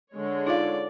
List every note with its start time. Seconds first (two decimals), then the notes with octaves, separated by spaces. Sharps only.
0.13 D3 G#3 C#5
0.47 D#4 F4 D5 F5